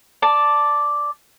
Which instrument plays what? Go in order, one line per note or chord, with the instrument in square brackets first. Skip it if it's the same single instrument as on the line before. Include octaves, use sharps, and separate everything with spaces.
[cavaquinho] D5 A5